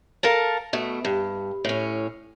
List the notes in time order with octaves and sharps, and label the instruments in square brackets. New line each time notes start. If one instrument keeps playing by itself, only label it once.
[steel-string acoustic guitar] A4 A#4 F5 A5
B2 A3
G2
A2 C#4